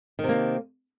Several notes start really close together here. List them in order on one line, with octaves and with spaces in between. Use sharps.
D#3 C3 A#3